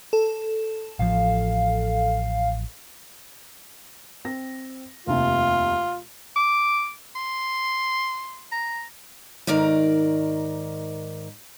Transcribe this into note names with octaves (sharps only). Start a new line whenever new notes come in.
A4
A1 F3 F5
C4 A#6
F1 D#2 C3 F4
D6
C6
A#5
G#2 D#3 A#4 D5 F5